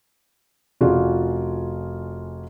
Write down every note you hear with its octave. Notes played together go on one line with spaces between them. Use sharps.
F1 C#4 F4 F#4 G#4 D5